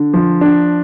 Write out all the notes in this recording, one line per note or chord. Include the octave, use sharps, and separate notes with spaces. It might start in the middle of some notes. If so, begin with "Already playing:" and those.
Already playing: D3
F3
D4